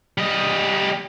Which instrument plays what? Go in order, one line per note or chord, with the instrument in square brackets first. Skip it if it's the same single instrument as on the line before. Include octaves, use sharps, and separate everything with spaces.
[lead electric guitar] G3 D#5